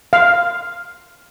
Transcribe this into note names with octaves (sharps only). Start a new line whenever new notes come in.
F5